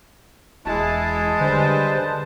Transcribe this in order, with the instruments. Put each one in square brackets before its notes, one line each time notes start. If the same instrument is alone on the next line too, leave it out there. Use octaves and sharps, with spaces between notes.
[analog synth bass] E1 [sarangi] G#3 [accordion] E4 [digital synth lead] A5
[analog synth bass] D3 [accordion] G3 B4 C5